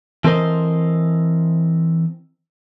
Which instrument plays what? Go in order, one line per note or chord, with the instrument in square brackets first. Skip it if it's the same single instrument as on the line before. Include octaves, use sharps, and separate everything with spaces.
[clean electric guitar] E3 C4 A4 A#4 C5 D#5